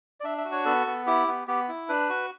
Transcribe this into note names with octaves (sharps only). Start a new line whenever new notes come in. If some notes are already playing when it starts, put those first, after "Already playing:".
D5
D4 E5
E5
F#4
C#5
B3 A4
B3
E4 G4
B3
B3 G4
E4
D4 B4
F#4